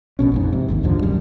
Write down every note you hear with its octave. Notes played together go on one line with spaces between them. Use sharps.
A#1 B2 C#4
A#1 F2 G#2
C3
G#1 D#2 G#2
D2 G#2 D3 F3
D1 C#2 F#2 G3